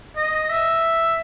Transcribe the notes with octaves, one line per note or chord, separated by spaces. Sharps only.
D#5
E5